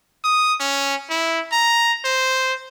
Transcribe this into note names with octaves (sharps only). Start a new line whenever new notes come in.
D#6
C#4
E4
A#5
C5